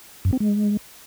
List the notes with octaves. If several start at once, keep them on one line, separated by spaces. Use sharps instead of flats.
F#2
C4
G#3